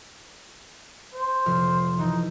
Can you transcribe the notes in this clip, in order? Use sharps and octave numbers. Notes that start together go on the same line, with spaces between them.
C5
F1 F3 F6
E3 D#4